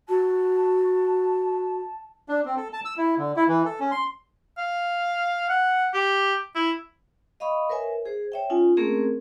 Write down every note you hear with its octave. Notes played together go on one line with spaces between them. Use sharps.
F#4 A5
D4
C4
A4
A5
E6
E4
D3
E4
E3
A4
C#4
C6
F5
F#5
G4
E4
D#5 F5 B5 C#6 D#6
A#4 B4 C#5 E5 G#5
G#4 C5
C#5 E5 G5
C#4 D#4 F4 G#5
A3 A#3 C4 C#4 G#4 A#4